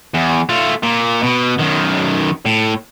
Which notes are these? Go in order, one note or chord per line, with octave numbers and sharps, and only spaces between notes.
E2
A3 F4
A#2
B2
F#2 D#3
A2